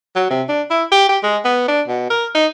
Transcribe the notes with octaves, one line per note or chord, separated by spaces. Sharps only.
F#3
C3
D4
E4
G4
G4
G#3
B3
D4
B2
A#4
D#4